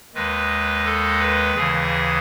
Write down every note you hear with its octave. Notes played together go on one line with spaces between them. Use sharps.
D#2 D#3 G#3 B4
A4
B4
D#2 C#3 E3 G#4